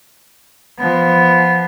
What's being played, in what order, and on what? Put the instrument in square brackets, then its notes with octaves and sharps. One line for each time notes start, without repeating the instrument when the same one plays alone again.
[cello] F3 B3